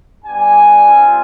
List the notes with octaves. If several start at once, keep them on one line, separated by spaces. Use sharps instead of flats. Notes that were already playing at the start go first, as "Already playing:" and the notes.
G3 B3 D4 G4 G#5
G3 C4 F4